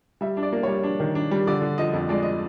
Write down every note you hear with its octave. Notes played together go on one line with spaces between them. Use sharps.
G3 E5
D4
D5
A#3
G3 C#5
D4
D#3
D4
G3
D3 D5
D3
F3 D#5
F2
G#3 D5
D#5